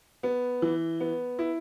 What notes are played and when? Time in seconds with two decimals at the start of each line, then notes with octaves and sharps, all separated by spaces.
0.23 B3
0.62 E3
1.00 B3
1.39 E4